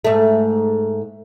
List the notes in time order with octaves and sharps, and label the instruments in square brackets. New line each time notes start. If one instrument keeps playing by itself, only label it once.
[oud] G#2 A3